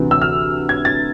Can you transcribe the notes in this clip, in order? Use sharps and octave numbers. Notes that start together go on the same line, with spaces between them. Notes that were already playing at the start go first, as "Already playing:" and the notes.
Already playing: D2 C3 E3
E6
F6
G#6
A6